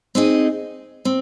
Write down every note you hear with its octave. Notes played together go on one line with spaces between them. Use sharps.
C4 D#4 G#4 D#5
C4